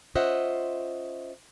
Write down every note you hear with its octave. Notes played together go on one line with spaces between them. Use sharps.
C#4 F4 C5 D#5 E5 F#5